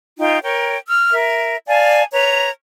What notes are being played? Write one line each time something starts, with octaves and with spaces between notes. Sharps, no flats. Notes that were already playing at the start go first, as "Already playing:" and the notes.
D#4 F4 G5
A#4 C#5 G5
E6 F6
A#4 E5
D5 F5 G#5 A5
B4 C#5 A#5